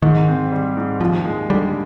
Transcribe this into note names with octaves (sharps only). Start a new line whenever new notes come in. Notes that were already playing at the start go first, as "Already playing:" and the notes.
G#2 D#3
C4
G3
G#2
D#2 F3
G#3
D3 G3